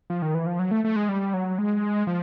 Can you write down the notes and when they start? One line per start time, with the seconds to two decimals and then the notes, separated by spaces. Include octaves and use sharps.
0.10 F3
0.22 D#3
0.34 E3
0.46 F3
0.59 F#3
0.71 A3
0.84 A3
0.96 G#3
1.09 G3
1.34 F#3
1.59 G#3
2.07 F3